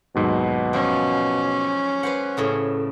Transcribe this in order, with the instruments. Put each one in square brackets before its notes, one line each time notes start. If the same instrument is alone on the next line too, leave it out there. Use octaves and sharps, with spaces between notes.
[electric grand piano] D#2 G#2 F#3 [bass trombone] B2
[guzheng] F3 [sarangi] C#4
[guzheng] B4 C5 F#5
A2 C#3 E5